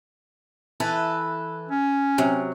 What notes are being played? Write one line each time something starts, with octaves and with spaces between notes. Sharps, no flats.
E3 A4 B4
C#4
C3 F#3